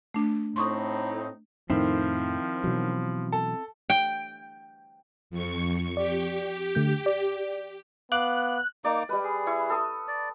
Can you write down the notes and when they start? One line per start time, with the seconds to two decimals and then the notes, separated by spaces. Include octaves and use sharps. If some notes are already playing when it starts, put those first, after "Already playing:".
0.14 A3 D4
0.56 A2 C4 D#4 C6 C#6 D#6
1.70 F2 A2 D#3 F3 C4 E4
2.64 B2 E3 F#3
3.32 A4
3.90 G5
5.30 F2 C#6
5.97 G4 D5
6.75 D3 A3 G6
7.06 D5
8.12 B3 F5 D6 F#6
8.85 A#3 D#4 D5 D6
9.09 G3 G#3 B4
9.24 G#4
9.47 E4 C#6
9.70 A4 D#6
10.08 D5